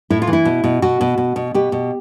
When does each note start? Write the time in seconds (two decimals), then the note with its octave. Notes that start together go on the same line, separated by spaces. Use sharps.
0.10 A2 E4
0.22 F4
0.27 E3
0.33 E4
0.45 B2
0.64 B2
0.82 B2 F#4
1.01 B2
1.18 B2
1.36 B2
1.54 B2 G4
1.72 B2